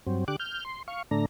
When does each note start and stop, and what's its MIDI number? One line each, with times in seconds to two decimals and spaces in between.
0.07 0.25 43
0.07 0.25 54
0.07 0.25 60
0.28 0.36 50
0.28 0.36 67
0.28 0.36 86
0.28 0.36 90
0.40 0.64 89
0.40 0.64 91
0.65 0.83 84
0.88 1.03 77
0.88 1.03 85
1.11 1.26 45
1.11 1.26 50
1.11 1.26 57
1.11 1.26 62
1.11 1.26 82